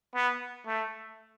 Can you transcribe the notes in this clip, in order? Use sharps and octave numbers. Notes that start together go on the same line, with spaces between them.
B3
A3